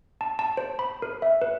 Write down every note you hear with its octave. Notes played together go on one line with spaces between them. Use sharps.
A5
A5
C5
B5
A#4
E5
B4